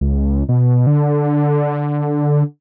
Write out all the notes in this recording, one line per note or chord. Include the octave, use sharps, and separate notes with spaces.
C#2
B2
D3